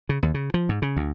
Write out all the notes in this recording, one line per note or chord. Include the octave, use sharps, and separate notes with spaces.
C#3
D#2
C#3
F3
G#2
C#3
D2